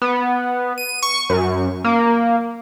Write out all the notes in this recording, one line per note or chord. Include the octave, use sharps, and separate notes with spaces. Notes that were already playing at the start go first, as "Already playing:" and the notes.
B3
D#7
C#6
F#2
A#3